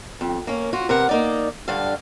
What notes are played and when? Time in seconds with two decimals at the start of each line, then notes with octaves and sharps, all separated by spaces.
0.21 F2
0.47 A#3 C#4
0.73 F4 F#4
0.89 C3 A#4 B4 F#5
1.09 A#3 D#4 D5
1.68 G2 D3 F5